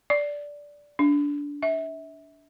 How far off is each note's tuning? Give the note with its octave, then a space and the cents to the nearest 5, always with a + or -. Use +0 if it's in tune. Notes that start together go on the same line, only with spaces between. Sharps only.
D5 -10
D4 -20
E5 -25